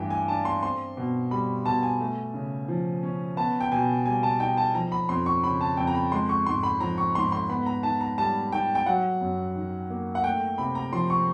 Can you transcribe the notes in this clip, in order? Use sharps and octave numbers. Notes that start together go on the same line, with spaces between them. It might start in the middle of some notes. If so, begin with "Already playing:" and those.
Already playing: G2 E3 A3 G5 G#5
G#5
D4 A5
C6
C4 C6
B2
G3 B5
B2 A5
G#5
A3
C#3
F3
C#4
B3 A5
G5
B2 G#5
G3 G#5
A5
D#4 G5
A5
F3 A#5
B5
F2 C6
C#6
C#3 B5
A5
F2 G5
A#5
B5
G#3 C6
C#6
G#2 C6
B5
F3 A#5
C#6
G#2 C6
C6
B3 B5
A#5
D#3 A5
A#5
G3 A5
D#3 G5
G5
F#3 F#5
F#2
D#3
A#3
F#5
A3 G5
C3 B5
A#5
F3 C6
C#6